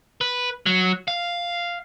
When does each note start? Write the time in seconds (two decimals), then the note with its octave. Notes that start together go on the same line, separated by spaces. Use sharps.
0.21 B4
0.66 F#3
1.08 F5